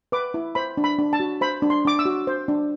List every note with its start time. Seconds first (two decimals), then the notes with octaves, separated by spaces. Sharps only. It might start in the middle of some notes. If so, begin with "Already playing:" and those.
0.12 B4 D6
0.34 E4
0.55 C5 B5
0.77 D4
0.84 B5
0.99 D4
1.13 A5
1.20 F#4
1.41 C5 B5
1.62 D4
1.70 C6
1.85 D4 D6
1.99 E6
2.05 F#4
2.27 C5
2.48 D4